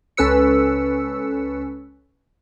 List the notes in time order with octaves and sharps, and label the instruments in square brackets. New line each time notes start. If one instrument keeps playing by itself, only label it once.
[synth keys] C#2 C#4 A4 B4 E6 C#7